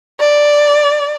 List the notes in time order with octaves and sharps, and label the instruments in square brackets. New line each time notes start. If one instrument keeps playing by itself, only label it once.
[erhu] D5